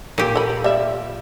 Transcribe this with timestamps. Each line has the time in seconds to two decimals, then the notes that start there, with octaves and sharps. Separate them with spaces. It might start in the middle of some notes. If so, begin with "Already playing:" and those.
0.18 A#2 G4
0.36 A4 B5
0.64 G3 F4 E5